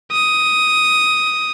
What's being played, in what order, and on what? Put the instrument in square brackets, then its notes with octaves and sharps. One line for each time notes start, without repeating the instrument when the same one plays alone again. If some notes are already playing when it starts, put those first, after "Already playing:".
[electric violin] D#6